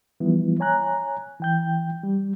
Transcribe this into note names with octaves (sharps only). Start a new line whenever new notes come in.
E3 F3 G3 B3 E4
C#5 G#5 A#5 F#6
E3 G5 G6
G3